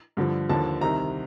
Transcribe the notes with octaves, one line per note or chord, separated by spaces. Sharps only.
G2 D3 F3
D#2 D3 F3 A5
C2 C3 D#3 A#5